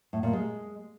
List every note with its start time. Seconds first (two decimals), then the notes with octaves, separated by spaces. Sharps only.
0.13 A2
0.23 A#2
0.33 G#3